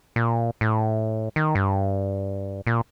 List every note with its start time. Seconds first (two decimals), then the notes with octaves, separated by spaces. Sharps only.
0.16 A#2
0.61 A2
1.36 D#3
1.55 G2
2.67 A#2